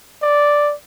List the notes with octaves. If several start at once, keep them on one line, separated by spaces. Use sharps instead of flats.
D5